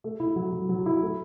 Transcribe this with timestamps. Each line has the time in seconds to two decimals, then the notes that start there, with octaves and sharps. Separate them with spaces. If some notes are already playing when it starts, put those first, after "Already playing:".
0.04 A3
0.20 E4
0.36 F#3
0.52 F#3
0.69 F#3
0.86 E4
1.02 A3